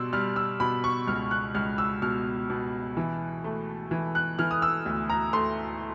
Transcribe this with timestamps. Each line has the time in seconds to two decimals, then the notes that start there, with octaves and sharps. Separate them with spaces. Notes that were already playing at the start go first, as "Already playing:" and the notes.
Already playing: B2 G3 C6 E6
0.13 G3 F6
0.36 E6
0.60 B2 B5
0.84 C#6
1.07 C#2 F6
1.31 F#6
1.55 C#2 F6
1.78 E6
2.02 B2 F6
2.49 B2
2.97 E3
3.44 A3
3.91 E3
4.15 F#6
4.39 E3 F6
4.51 D#6
4.62 E6
4.86 D2
5.10 A#5
5.33 A3 C6